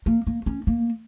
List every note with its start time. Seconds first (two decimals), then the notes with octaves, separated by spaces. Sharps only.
0.06 A#3
0.27 A#3
0.46 C#4
0.67 A#3